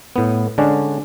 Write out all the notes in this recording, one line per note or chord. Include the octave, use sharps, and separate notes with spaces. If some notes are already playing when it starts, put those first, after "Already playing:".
A2 B3
D3 G#3 C#4 D4